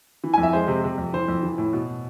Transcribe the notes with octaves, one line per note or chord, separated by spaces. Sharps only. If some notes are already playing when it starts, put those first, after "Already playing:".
E3
G#5
F2
E5
G#3 C5
C3
C3
F2
E3 C5
F2
E3
A2
B2